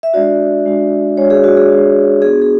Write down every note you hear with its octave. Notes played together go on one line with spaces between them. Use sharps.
E5
G#3 D4 F#4 D5
G#3 D4 F#4
G#3 D4 F#4 C#5
G#4
F#4
G#4
G#3 D4 F#4
B3 D4 F#4 G#4
G#4